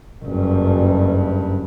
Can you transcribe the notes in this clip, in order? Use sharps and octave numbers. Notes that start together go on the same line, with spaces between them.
F#1 G2